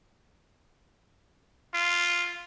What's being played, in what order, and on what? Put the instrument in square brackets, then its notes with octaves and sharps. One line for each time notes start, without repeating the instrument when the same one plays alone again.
[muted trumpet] F4